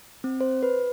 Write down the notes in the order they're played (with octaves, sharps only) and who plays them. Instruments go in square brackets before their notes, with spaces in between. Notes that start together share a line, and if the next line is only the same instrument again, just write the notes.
[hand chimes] C4
C5
B4